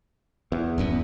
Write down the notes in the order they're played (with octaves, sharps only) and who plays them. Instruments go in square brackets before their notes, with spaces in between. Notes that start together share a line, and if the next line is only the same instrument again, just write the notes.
[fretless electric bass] E2
[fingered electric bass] D1 F#2 B3